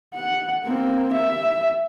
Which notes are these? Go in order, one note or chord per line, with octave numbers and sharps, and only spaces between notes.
F#5
A#3 C4
E5